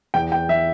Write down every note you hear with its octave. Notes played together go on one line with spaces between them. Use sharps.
E2 G5
G5
E3 E5